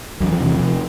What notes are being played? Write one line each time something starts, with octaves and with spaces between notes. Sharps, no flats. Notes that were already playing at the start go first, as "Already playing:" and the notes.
E2 F#3
F3
C3 E3
C3 F3